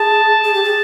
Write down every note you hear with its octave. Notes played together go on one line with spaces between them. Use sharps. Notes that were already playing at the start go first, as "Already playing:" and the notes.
Already playing: G#4 A5
G#4
G4
G#4